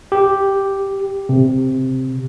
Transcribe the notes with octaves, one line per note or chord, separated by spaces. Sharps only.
G4
C3